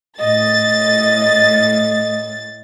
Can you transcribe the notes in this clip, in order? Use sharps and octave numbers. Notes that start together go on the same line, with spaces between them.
A2 D#5 A6